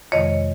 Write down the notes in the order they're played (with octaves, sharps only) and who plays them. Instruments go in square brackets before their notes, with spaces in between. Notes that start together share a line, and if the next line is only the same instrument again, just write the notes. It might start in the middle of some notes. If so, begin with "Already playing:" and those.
[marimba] F2 C3 D#3 G#3 C#5 D#5